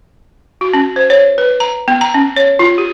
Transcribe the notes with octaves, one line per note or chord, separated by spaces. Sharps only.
F#4
C#4
C5
C#5
B4
A#5
B3
A#5
C#4
C#5
F4
G4